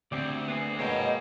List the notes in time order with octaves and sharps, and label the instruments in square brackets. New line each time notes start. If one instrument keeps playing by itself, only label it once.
[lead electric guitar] D2 [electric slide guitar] C4 G4 D5
[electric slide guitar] B3 C4 G#4
[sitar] F2 D#5 [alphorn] B2 [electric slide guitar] G#3 A#3 [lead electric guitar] C#5 G5